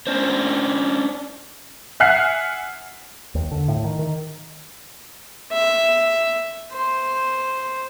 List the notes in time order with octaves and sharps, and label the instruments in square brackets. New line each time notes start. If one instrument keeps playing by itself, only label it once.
[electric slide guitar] C#4 D4 C5
[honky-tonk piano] E5 F#5 G#5 F6 F#6 C7
[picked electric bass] D#2
D3
A2
D#3
D#3
[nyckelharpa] E5
C5